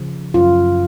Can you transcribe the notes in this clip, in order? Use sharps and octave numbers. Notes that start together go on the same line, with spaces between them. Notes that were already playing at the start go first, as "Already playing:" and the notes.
Already playing: C#3 F3
F#2 F4